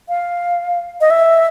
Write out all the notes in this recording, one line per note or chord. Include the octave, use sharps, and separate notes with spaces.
F5
D#5
E5